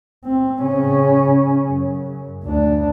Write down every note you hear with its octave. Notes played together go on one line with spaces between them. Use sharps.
C4
C#3 C#4
F#2
D2 D4